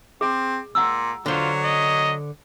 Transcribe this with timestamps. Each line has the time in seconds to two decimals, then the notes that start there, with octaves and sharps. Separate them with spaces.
0.21 C4 G#4
0.75 A#2 F#5 A#5 E6
1.26 D3 F#3 F4 C5
1.64 D#5